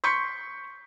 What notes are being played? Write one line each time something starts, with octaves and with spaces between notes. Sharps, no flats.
C6 C#6 G6 B6 C#7